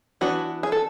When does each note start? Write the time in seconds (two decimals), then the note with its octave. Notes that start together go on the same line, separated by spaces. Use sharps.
0.21 E3 B3 D4 F#4
0.63 G#4
0.72 A4